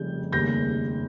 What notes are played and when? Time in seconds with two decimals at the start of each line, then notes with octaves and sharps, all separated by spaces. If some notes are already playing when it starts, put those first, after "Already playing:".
Already playing: F1 F2 C#3 G3 G6
0.32 F1 D#2 C#3 G3 A#3 G6 A#6